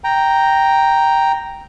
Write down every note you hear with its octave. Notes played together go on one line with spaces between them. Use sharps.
G5 A#5